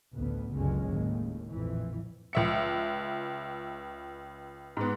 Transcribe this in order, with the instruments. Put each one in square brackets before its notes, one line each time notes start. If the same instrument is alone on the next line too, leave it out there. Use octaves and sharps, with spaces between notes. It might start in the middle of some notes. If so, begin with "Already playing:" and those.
[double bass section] A1 D2 B3
F#1 C#2 F#2 D3 G#3 C#4
D#2 A2 C#3
A#1 F2 A#2 E3
[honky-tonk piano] C#2 E5 C#7
G#2 B3